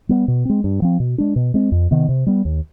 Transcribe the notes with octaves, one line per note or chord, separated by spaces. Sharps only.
G3 B3
B2
G#3 C4
G2
F3 C4
B2
G#3 D4
B2
G#3 C4
F2
C3 D#3 B3
C3
G3 B3
D#2